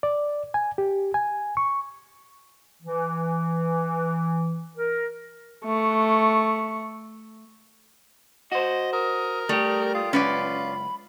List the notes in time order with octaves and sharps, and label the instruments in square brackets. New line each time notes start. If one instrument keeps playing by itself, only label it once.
[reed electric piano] D5
G#5
G4
G#5
C#6
[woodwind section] E3
A#4
[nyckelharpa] A3 C#6
[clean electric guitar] F#4 C5 [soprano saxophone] D#5
[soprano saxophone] A#4 [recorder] D#6
[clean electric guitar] G3 G4 [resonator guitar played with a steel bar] A3 [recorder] D#6
[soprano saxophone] F4 [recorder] D#6
[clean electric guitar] C#2 F#2 [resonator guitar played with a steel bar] C#4 B4 D5 [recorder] B5